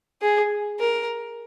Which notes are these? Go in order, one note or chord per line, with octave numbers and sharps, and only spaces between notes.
G#4
A#4